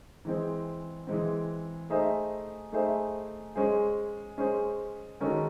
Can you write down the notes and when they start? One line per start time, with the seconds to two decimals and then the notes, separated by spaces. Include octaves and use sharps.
0.25 E3 G#3 C4
1.07 E3 G#3 C4
1.90 A3 D#4 G#4 C5 E5
2.72 A3 D#4 G#4 C5 E5
3.55 G#3 C#4 G#4 C5
4.38 G#3 C#4 G#4 C5
5.20 D#3 G#3 C#4 F#4 A4